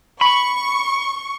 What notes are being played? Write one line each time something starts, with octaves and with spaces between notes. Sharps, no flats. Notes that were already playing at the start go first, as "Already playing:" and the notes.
B5 C#6